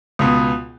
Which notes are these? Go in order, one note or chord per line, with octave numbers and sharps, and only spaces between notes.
C#2 B2 B3